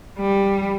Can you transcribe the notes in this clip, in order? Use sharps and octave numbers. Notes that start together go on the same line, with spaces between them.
G3